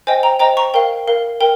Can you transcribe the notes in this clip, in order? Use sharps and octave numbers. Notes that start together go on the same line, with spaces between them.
C5 D#5 G5 G#5
G5 A#5
C5 D#5 G5 A#5
A#5 C#6
A#4 F5 G5
A#4 F5
A#4 G5